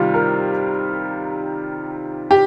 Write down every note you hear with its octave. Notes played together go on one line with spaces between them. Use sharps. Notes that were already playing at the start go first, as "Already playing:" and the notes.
Already playing: C3 D#3 G3 F4
A#4
G4